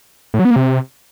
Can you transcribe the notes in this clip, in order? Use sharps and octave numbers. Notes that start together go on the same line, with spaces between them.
A2
F#3
B3
A#3
C3